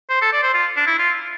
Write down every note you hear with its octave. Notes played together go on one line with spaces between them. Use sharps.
C5
A4
D5
C5
F4
D4
E4
F4